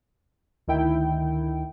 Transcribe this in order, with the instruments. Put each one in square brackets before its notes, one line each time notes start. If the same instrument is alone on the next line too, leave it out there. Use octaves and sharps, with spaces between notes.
[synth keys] D2 D#3 E4 G5